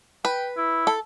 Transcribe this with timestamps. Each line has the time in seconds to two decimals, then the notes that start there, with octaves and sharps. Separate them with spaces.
0.25 B4 G5
0.57 E4
0.87 A4